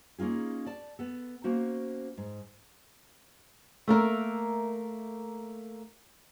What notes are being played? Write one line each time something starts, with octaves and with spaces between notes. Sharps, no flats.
A#3 C#4 D#4 F4 G#4
D5 A5
B3 A4
A#3 C#4 F#4 C5
G#2
A3 A#3 A#4 E5